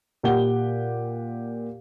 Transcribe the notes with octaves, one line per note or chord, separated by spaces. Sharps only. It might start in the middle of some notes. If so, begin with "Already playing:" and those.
A#2 G4 F#5 G7